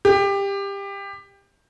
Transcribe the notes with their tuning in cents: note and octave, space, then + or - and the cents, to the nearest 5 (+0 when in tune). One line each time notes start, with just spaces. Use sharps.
G4 +20